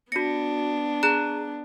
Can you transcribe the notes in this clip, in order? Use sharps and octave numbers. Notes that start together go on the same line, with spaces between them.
B3 D4 F#4 A#6 C#7
G#4 A#5 F#6 E7